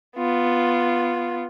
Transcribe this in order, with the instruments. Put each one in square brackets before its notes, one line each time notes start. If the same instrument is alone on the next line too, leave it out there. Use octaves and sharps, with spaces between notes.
[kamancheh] B3 F4